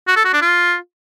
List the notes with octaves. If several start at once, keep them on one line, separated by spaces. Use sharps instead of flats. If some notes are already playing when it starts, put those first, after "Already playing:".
F#4
A4
F#4
D4
F4